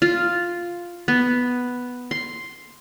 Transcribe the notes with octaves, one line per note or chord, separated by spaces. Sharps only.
F4
B3
C6